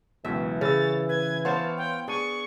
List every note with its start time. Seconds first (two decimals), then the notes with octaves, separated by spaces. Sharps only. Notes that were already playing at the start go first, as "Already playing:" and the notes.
0.25 C#2 F#2 B2 E3 E5
0.61 C#3 C#5 B5 E6 A6
1.09 B4 G#6
1.45 B3 C5 C#5 F5 A5 C6
1.77 G5
2.08 D4 G#4 C#6 D#7